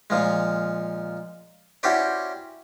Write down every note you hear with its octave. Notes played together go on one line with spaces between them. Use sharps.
A#2 F3 G#3
C#4 E4 F#4 G4 C5 D5